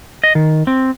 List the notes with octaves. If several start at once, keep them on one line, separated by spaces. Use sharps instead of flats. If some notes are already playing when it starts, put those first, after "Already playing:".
D#5
D#3
C4